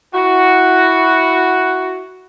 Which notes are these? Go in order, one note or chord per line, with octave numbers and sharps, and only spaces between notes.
E4 F#4